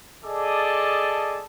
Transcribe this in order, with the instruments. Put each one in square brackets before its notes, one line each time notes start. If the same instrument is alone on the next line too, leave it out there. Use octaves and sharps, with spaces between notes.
[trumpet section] G#4 A4 D5 D#5 A5 D6